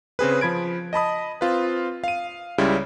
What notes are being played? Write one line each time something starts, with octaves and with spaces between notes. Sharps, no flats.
C#3 C4 G#4 B4
F3 B5 G#6 D7
D#5 A5 B5 D#6
C4 F4 B4
F5 D#7
C#2 C#3 G3 E4 C6